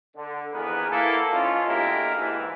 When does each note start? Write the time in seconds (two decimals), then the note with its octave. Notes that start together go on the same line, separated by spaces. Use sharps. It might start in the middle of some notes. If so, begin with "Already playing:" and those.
0.16 D3
0.53 F2 E3 B3 G#4 A#4 B4
0.90 A#3 E4 A4
1.31 G#2 G#3 C#4 F4
1.67 B2 D3 A#3 E4 G4 A#4
2.15 G#2 E3 A#3